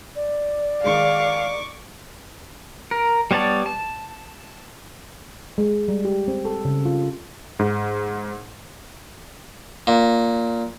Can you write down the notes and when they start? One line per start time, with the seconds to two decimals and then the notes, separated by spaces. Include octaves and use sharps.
0.16 D5
0.84 D#3 G#3 F5 C#6 D6
2.91 A#4
3.31 G3 B3 C#5 D5 A5
3.66 A5
5.58 G#3
5.88 G3
6.05 G4
6.28 C4
6.45 A4
6.65 C#3
6.85 F4
7.59 G#2
9.87 A#2